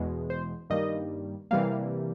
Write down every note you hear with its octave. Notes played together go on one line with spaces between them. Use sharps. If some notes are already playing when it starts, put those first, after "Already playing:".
Already playing: E2 B2 G#3
C5
G2 D#3 G3 A#3 D#5
C3 E3 G3 A#3 F5